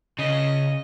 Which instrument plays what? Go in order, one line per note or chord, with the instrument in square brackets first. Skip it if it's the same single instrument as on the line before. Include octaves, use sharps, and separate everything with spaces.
[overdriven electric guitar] C#3 [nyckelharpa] D#5